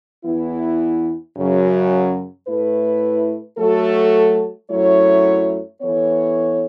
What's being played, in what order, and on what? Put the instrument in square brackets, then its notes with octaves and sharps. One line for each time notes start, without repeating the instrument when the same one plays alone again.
[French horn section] E2 E3 B3 E4
F#2 C#3 F#3
A2 A3 E4 B4
F#3 A3 F#4 A4
F#2 F#3 A3 E4 C#5
E3 B3 A4 C#5